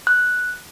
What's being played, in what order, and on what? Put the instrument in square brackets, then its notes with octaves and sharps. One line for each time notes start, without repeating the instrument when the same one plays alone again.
[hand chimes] F#6